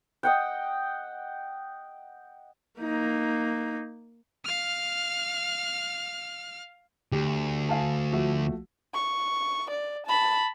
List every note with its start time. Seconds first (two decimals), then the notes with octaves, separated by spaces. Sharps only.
0.23 D#5 F#5 G5
2.80 A#3 D#4
4.45 F5 F6
7.12 D2 G4
7.69 F5 G#5 A5
8.13 F3 A3 F#4
8.95 C#6
9.71 D5
10.07 A5 B5